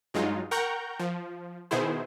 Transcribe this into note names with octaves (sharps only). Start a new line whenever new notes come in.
G2 F#3 G#3 D#4 F4
A#4 F#5 G5 A#5 C#6 G6
F3
B2 D#3 B3 E4 G#4 C5